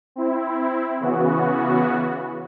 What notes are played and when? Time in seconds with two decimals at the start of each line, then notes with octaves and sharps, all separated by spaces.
0.16 C4 E4
1.00 C#3 E3 B3 F#4